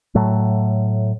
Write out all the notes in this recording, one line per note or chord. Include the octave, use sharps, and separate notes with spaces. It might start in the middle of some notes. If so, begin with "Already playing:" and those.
A2 F#3 A3